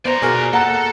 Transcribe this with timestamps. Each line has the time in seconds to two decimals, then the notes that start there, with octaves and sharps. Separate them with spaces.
0.06 B3 C5 D5 A#5
0.22 B2 F#4 G#4 A#4
0.53 A#3 A4 F#5 A#5 F#6